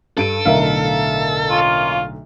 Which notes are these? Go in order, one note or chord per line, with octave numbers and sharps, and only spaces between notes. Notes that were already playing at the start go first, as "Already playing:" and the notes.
G2 A4 D7 D#7
B1 A2 D3 A#4 E5 F5
A#3 C#4 F4